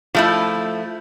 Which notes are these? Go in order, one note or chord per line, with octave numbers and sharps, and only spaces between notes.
F3 A3 E4